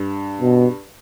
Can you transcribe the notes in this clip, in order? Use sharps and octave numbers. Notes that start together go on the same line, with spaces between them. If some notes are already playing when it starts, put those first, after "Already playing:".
Already playing: G2
B2